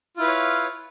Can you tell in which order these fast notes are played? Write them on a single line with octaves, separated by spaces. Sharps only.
F4 E4 B4 F5 C#5